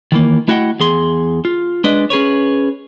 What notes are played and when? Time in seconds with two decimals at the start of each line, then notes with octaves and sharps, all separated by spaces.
0.12 D#3 E3 A#3
0.48 A3 E4 F#4 D#5 F#5 G5
0.80 E2 G#4 C6
1.45 F4
1.84 G#3 D4 B4 D5 D#5
2.10 C#4 G#4 B4 C#5